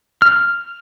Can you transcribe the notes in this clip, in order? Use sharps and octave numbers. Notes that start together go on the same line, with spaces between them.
F6